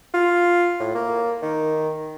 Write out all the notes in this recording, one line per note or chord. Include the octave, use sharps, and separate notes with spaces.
F4
A2
A#3
D#3